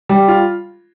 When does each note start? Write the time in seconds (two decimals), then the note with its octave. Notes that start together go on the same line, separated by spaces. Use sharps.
0.09 G3
0.28 F4